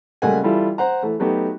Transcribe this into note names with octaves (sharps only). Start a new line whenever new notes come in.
C#2 G3 A3 A#3 F#5 G#5
E3 G3 E4 F4 A4
C5 F#5 A#5
E3 A3
F#3 A3 B3 D#4 F#4 G4